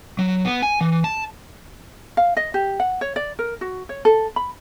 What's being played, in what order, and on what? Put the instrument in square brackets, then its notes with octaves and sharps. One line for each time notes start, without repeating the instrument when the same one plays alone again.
[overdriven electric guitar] F#3
B3
G#5
E3
A5
[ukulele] F5
D#5
G4
F#5
C#5
D5
A#4
F#4
C#5
A4
B5